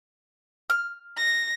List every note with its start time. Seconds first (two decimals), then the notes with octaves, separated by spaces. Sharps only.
0.70 F6
1.17 A#6